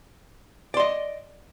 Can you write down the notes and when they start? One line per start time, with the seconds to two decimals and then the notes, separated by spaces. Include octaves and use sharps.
0.74 D5
0.77 C6
0.80 D#5